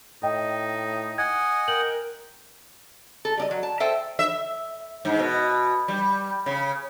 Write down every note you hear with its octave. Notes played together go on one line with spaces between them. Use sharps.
A2 D#4 D#5 G5
D#5 F#5 G#5 G#6
A#4 G5 F#7
A4
G3 D4 D#5
F#3
A5
A4 C5 E5 G5 G#5
E5
G#2
B2
G3
C#3